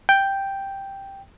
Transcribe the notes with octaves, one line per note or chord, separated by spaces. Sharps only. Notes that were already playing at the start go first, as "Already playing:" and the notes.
G5